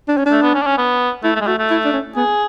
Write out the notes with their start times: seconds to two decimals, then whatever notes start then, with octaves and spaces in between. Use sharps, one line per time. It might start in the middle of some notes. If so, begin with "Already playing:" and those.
0.08 D4
0.17 C#4
0.26 D4
0.32 A3
0.43 B3
0.54 C#4
0.62 D4
0.66 C#4
0.78 B3
1.23 A3 E4
1.35 A3
1.41 G#3
1.47 A3 F#4
1.59 A3
1.70 E4
1.85 D4
1.93 C#4
2.16 B3 G#4